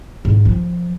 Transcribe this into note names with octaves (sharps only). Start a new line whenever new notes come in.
G#2
F3